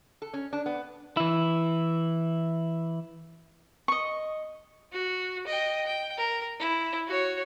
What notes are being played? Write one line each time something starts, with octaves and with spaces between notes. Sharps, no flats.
A4
C#4
D4
B3
E3 E4
D#5 C#6
F#4
D#5 G5
G5
A#4
E4
F#4 C#5